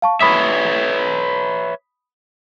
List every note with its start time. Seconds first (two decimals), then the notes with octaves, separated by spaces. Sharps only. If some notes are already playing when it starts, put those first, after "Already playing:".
0.02 F5 A5 C#6
0.21 B4 C#5 E5 B5 D#6 B6